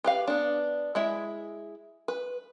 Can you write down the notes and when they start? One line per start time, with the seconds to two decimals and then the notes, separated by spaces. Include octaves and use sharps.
0.04 G4 B4 F5
0.28 B3 D4
0.95 G#3 E4 E5
2.08 B4